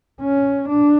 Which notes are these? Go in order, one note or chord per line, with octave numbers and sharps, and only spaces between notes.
C#4
D4